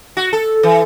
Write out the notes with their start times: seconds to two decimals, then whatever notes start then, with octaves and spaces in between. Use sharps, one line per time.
0.17 F#4
0.33 A4
0.63 E3